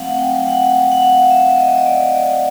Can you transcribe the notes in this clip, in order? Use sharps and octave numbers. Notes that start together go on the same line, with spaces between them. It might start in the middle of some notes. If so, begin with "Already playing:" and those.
Already playing: F#3 A3 C4 F5 F#5
G5
G5
F#5
F#5
F5
E5
D#5
D#5
D5
D5